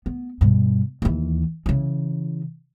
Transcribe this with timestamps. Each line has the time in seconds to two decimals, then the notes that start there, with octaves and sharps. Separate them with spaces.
0.06 B3
0.41 G2 B2
1.02 D#2 E3
1.66 C#3 E3